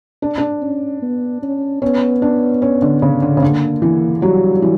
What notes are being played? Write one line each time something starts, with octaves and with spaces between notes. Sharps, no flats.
D4
D4
C#4
B3
C#4
B3 C#4
D4
C#4
D3
C#3
D3
C#3
D3 A#3
E3
F#3 G3
E3